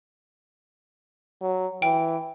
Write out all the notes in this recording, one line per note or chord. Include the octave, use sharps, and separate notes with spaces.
F#3
E3 G5